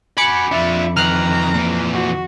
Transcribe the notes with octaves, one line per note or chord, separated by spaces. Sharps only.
F#4 G#5 B5 D6 C#7
F2 D4 F4 E5
D#3 E3 A#5 F6 F#6
A#2 E3
F#4